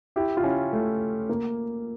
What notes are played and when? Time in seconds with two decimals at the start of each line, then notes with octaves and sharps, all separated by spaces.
0.16 E4 G4
0.37 F4
0.44 C#4 E4
0.73 A3
1.29 A#3